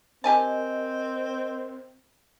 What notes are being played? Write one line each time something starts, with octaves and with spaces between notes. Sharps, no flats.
C4 G4 A#4 D#5 G#5 A5